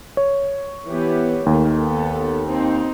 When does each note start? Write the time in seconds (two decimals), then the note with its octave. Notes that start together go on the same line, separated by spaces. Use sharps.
0.17 C#5
0.87 E3 B3 G4
1.46 D#2 D#3 A3
1.78 B3 A4
2.46 C4 D#4